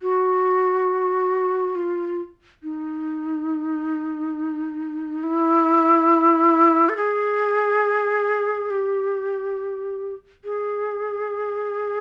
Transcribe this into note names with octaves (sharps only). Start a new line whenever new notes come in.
F#4
F4
D#4
E4
A4
G#4
G4
G#4